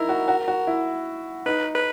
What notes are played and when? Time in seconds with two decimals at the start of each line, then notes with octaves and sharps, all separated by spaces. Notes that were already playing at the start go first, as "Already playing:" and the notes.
Already playing: D#4 E4 A#4
0.09 F#4
0.28 F#4
0.48 F#4
0.67 E4
1.46 D#4 B4
1.75 B4